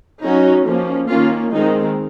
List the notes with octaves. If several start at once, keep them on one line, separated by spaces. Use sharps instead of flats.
F#3 C#4 D#4 F#4
F3 A#3 C#4
D#3 A#3 C#4 F4
D#3 G#3 C4 D#4